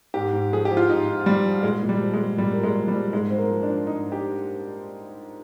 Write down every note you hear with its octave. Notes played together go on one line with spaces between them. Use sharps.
G#2 G4
G#2
F3 G#4
G4
F3
F4
G#2 D#4
G#2
F3 G3
F3
A#2 G#3
A#2
G3
F3
G#3
F3
A#2 G3
A#2 A#3
G#3
F3
G3
F3
G#2 G#3
G#2 C4
A#3
F3
D4
F3
G#2 D#4
G4